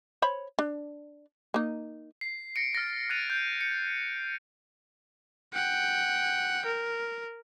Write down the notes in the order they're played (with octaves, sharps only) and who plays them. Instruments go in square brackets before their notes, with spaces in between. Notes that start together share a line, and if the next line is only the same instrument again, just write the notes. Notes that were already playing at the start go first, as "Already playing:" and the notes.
[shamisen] C5 C#5 B5
D4
A#3 D#4
[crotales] C7
A#6 C#7 D7
F6 A6 A#6 C#7
F6 F#6 G#6 A6 D#7 F7
G6
C#7
[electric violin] F#5 G5
A#4